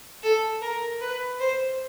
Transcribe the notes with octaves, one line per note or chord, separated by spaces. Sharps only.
A4
A#4
B4
C5